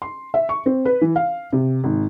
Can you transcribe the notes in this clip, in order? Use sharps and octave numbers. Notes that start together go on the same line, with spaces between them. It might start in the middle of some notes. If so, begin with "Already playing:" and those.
C6
E5
C#6
C4
B4
E3
F5
C3
G#1